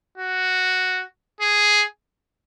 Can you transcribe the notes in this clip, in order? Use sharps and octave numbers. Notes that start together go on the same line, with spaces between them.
F#4
G#4